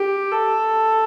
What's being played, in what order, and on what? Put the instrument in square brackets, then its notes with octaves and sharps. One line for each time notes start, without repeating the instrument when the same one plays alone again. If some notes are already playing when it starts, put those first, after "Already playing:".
Already playing: [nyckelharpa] G4
A4